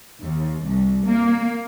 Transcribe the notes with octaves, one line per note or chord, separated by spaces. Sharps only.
D#2
C2
A#3